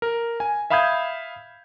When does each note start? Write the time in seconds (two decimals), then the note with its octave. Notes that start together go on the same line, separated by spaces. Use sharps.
0.02 A#4
0.40 G#5
0.70 E5 F5 B5 D#6 G6 G#6